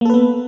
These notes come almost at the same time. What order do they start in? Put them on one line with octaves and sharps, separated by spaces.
A#3 A4 B4 B3